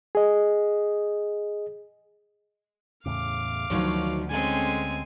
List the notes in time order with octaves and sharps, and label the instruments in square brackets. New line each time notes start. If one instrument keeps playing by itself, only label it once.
[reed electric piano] G#4 D#5
[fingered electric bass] E2 A2 C#3 [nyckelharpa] F5 D6
[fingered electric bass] D2 D3 [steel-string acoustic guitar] D#3 F#3 C#5 [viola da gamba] F3
[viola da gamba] G#3 C4 C#4 [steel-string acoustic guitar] A4 [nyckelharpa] G#5